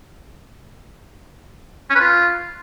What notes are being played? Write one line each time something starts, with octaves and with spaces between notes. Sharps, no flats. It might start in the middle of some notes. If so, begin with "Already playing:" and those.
C#4
B4
F4